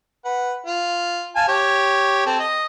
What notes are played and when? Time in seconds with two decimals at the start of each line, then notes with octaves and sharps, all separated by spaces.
0.25 B4 F#5
0.66 F4
1.36 F5 G#5 A5
1.48 G4 C#5
2.26 C4 A4
2.39 D#5